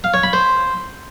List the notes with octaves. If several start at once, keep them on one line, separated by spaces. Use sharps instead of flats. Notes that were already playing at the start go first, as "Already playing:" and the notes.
F5
C#5
B5
C5